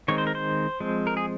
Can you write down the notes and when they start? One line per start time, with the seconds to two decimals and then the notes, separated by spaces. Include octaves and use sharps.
0.08 D#3 G#3 C4 C#5
0.18 C5
0.27 A#4
0.35 C5
0.80 F3 G#3 C4
1.07 A#4
1.17 G#4